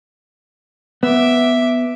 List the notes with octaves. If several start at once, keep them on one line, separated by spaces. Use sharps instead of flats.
B3 E5 D6